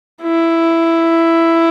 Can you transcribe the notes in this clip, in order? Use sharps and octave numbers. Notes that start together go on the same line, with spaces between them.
E4